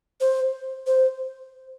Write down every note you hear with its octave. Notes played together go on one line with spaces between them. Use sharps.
C5
C5